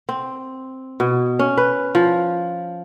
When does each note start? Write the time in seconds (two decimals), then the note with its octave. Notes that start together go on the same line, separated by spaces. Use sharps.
0.09 C4
1.00 B2
1.39 C#4
1.57 B4
1.95 F3